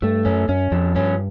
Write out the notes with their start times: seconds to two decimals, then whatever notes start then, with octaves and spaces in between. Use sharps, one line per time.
0.02 G2 A3
0.25 F#2 C#4
0.49 F#2 C#4
0.71 F2 F3
0.95 G2 C#4